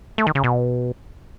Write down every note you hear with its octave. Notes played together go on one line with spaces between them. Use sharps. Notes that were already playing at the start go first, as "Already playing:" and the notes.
A3
D#3
C#3
B2